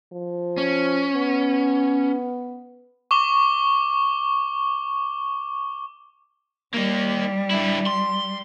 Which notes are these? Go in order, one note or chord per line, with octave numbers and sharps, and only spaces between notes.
F3
C#4
B3
C#6 D6 G7
G3 A#3 D#4
D3 E4
C6